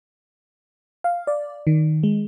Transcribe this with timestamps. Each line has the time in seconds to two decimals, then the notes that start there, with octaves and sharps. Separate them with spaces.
1.04 F5
1.27 D5
1.67 D#3
2.03 G#3